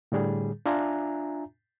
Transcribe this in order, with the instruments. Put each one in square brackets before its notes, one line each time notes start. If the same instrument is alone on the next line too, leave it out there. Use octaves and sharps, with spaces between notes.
[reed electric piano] A2 D3 G3 G#4
D4 F4 E5 G#5 A#5